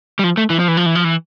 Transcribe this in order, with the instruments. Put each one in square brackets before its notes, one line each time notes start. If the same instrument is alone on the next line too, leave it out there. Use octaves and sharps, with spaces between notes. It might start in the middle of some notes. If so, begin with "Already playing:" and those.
[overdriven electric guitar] G3
F3
A3
E3
F3
E3
F3
E3
F3
E3